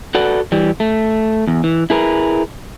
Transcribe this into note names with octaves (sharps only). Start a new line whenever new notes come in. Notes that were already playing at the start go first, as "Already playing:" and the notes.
F#4 A4 B4 D5 F#5
E3 G3
A3
E2
E3
E4 G#4 A#4 B4